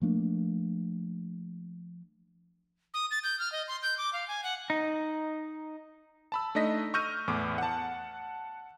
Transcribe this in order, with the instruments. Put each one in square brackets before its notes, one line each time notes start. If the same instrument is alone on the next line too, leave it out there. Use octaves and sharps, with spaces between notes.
[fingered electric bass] F3 A3 A#3 D4
[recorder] D#6
A6
G6
F6
D#5
C6
G6
D6
F5
G#5
F#5
[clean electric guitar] D#4
[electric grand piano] A5 B5 E6
A3 D4 D#4 D#5 A#6 B6
C#6 E6 F6 G6 A#6 D#7
E2 A2 D6
F#5 A5